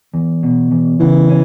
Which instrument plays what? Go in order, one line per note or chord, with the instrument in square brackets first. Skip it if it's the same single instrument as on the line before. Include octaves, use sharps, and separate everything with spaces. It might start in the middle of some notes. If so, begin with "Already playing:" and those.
[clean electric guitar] E2
B2
E2
[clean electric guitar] C#3 [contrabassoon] E3
[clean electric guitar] C#4